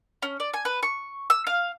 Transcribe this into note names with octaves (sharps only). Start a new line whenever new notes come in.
C#4
D5
G#5
B4
C#6
E6
F5